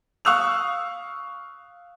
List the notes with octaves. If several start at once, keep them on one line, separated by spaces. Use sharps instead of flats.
F5 C#6 D#6 E6 F#6 F7